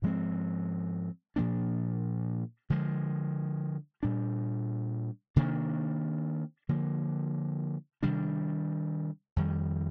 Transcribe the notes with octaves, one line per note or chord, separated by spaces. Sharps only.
G#2 F3 G#3 C4
A#2 F3 A#3 D4
D3 F3 G#3
A#2 G3 D4
C3 D#3 A#3 D4
D3 F3 A#3
C3 D#3 G3 D4
F2 D#3 G3